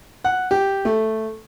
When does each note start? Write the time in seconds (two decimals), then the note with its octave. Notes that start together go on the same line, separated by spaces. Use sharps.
0.24 F#5
0.51 G4
0.85 A3